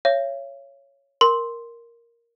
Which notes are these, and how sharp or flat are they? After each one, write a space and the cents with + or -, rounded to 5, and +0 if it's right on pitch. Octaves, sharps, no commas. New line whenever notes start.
C#5 +0 F5 -45
A#4 +0 C6 +0